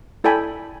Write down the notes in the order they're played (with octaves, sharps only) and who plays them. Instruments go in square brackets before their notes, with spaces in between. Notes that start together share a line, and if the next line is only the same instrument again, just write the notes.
[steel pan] E4 A4 D5 G5 G#5 B5